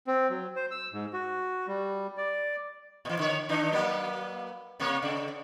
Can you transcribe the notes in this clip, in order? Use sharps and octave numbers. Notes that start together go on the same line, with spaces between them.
C4
F#3
C5
E6
G#2
F#4
G3
D5
A#2 E3
D3 C#5
D#3 D4 D#4
F#3 A#3 B3
C3 A#3 C#5
C#3